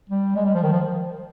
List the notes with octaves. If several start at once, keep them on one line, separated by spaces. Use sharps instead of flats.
G3
G#3
G3
F3
D#3
F3